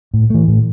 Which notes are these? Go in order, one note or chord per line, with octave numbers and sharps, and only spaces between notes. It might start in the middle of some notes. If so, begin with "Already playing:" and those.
A2
E3 A3
A2